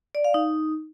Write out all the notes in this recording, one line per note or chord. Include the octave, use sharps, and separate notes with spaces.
D5
F5
D#4